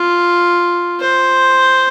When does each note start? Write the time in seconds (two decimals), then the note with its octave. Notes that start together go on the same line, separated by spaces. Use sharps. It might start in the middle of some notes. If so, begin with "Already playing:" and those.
Already playing: F4
1.00 C5